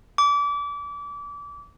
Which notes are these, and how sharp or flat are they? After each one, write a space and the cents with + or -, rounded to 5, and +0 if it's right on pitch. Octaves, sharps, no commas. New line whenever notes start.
D6 -30